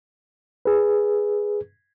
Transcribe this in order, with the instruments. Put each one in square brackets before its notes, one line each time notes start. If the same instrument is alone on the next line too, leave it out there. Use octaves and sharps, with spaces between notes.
[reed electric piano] G#4 B4